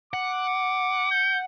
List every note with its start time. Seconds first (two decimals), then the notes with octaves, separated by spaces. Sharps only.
0.14 F#5 D6
1.11 G6